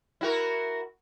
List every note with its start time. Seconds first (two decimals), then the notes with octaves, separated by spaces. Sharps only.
0.21 E4 F#4 A#4